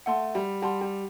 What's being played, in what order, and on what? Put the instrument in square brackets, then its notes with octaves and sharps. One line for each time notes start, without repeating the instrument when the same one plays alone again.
[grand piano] A3 [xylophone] F#5 A5 C6
[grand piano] G3
[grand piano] G3 [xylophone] F#5 A5 C6
[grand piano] G3